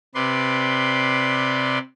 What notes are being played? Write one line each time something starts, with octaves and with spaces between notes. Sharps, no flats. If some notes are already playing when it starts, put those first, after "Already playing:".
C3 B4 D5 C6